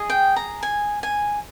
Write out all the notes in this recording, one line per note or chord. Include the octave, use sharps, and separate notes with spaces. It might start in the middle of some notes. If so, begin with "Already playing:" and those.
Already playing: G#4 D#5
G5
A#5
G#5
G#5